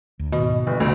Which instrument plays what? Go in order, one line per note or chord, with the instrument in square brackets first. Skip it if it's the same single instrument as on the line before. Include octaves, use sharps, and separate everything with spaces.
[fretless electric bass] D2
[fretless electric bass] G#2 D#3 [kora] B2
[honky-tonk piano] G1
[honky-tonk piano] D2 [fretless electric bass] C#3 A#3